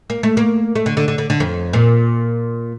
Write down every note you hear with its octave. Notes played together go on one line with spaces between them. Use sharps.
A#3
A3
A#3
A3
D3
D3
D3
D3
D3
F2
A#2